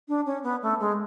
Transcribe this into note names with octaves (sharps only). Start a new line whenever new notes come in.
D4
C#4
B3
A3
G#3